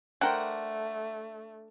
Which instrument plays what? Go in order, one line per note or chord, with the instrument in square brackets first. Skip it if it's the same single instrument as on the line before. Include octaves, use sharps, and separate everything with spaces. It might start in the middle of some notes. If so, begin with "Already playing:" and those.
[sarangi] A3 [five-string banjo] D4 A#4 [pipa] C5 F#5 [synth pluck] G5